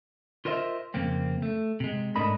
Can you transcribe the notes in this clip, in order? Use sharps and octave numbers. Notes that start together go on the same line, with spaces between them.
F4 A#4 C5 D#5 E5
F2 C#3 A#3 C4
A3
C3 G#3
G#2 A3 D4 A#4 D#5 B5